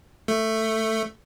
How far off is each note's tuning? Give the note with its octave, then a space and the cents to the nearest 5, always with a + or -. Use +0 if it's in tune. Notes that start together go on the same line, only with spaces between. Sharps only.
A3 +5 A4 +15